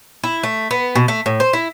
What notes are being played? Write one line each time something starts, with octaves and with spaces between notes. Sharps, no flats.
E4
A3
B3
B2
A3
A2
C5
E4